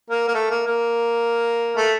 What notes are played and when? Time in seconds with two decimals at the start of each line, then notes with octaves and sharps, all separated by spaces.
0.10 A#3
0.28 A#3
0.35 A3
0.50 A#3
0.67 A#3
1.77 A3